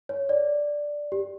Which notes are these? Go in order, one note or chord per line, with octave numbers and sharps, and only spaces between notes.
C#5
D5
G4